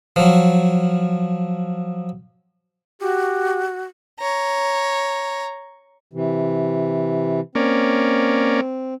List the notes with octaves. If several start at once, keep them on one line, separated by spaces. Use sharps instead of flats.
F3 F#3
F#4 G4
C#5 A#5
C3 E3
A#3 C4 C#4 D5